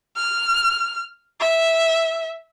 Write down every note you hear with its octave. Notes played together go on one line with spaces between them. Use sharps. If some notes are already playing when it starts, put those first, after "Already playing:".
F6
E5